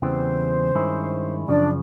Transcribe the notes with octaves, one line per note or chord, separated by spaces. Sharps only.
E2 C#3 E3 G3 C4 C5
G2 D#3 G#3 C#4 E4
F#2 C#3 F3 D4 D5